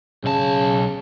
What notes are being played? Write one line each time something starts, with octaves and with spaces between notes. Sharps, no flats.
B1 C#3 A5